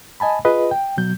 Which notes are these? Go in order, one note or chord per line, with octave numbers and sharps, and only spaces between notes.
D#5 G#5 A5 B5
F4 G#4 B4 D#5
G5
B2 F#3 G6